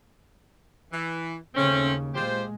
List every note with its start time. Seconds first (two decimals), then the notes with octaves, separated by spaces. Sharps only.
0.93 E3
1.55 D#2 C#3 A3 C4 C#4
2.15 A#2 G#3 F4 G4 C5